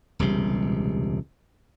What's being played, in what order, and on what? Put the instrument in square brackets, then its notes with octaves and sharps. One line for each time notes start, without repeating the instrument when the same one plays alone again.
[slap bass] E1 C#2 C3 G3